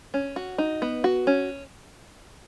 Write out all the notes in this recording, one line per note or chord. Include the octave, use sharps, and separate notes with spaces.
C#4
F#4
D#4
B3
F#4
C#4